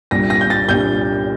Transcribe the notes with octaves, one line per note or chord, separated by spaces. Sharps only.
C2 A#2 G3 D4 A#6
A#6
G6
A6
C2 A#2 G3 D4 G6